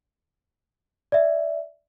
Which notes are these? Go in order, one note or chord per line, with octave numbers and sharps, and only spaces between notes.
D5 E5